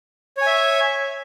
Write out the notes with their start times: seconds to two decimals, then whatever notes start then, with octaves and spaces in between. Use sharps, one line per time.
0.37 C#5
0.42 G#5
0.46 E5